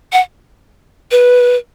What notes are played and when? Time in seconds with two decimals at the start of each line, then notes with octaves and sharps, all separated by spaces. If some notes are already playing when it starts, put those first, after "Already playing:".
0.13 F#5
1.11 B4